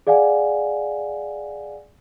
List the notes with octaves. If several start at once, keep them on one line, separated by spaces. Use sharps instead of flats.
G#4 D5 F5 F#5 G#5